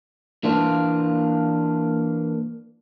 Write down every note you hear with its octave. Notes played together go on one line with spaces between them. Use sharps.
E3 A#3 D4 F4